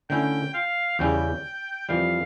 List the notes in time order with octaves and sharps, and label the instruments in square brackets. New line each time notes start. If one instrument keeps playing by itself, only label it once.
[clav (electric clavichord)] D3 A3 C#4 E4 [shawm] G5
[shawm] F5
[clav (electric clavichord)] E2 C#3 G3 C#4 E4 [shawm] G5
[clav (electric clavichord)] F2 E3 G3 [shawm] F5